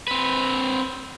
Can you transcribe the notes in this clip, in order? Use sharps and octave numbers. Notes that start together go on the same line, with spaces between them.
C4 B4